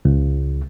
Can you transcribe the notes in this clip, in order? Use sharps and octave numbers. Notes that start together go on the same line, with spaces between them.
C#2